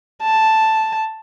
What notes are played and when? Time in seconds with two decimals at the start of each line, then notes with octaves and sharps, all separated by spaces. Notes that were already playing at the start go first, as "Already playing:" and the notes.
0.23 A5